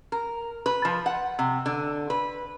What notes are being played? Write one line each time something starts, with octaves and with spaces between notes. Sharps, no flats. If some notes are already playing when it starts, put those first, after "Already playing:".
A#4
B4
F3
F#5
C3
D3
B4